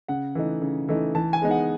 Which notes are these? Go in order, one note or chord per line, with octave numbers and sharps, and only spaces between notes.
C#3 F#5
E3 A3 D#4
C#3
E3 A3 D#4
E3 A5
G#5
G#3 B3 D#4
F#5